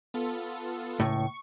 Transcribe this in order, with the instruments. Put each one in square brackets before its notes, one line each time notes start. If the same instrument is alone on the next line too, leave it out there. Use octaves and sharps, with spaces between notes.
[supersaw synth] B3 F4 A4
[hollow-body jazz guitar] C#2 A2 [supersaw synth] C#6